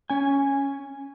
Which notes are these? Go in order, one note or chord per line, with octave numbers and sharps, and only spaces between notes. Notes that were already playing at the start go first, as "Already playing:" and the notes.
C#4 G#5